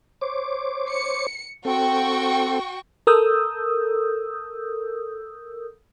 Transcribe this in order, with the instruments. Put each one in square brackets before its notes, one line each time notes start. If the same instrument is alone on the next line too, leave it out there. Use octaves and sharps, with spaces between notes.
[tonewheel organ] C5 C#5 D6
[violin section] C#7
[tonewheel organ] C4 A4 [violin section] F#4 G5 C#6
[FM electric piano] A4 A#4 D#6 E6 G6